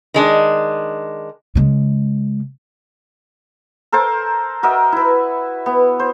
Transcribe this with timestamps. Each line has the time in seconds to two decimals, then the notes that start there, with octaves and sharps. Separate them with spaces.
0.14 D#3 G#3 D4
1.55 C#3 G#3
3.92 A4 A#4 C5 A5
4.63 F#4 A#4 D#5 E5
4.92 E4 B4
5.66 B3
6.00 C5